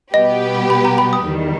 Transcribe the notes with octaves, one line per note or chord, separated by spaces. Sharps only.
B2 G3 B3 G4 B4 D#5
B5
A#5
B5
D#6
E2 D#3 G3